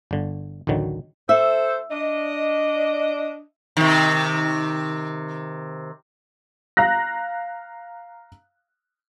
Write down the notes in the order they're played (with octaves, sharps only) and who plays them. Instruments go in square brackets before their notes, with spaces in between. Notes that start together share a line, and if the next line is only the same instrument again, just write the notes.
[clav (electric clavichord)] G1 D3
A1 D2 D3 D#3 F#3
[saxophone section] A4 C5 [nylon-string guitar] E5
[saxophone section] D4 D#5
[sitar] C3 D#3
[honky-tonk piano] F5 A#5 F#6 A#6